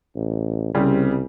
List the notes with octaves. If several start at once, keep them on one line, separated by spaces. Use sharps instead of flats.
A1
C2 C#3 G3 C4